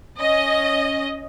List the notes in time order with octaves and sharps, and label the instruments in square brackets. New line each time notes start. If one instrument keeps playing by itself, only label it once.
[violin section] C#4 D#5